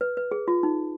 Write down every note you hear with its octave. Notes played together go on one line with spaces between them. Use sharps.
B4
B4
G#4
F4
D#4